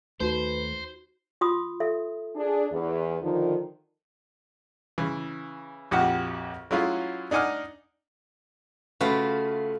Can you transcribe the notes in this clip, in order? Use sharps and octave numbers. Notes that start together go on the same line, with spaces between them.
D#2 A3 D#4 F#4 B4 C5
F4 C6 D#6
A4 E5
D4 G#4
E2
D3 D#3 F3
C#3 E3
A#1 F2 F#4 G4 F#5
F#3 G#3 C#4 E4 F4
D4 D#4 F#5 G#5 D6 F6
C#3 A3 F4 F#4 B4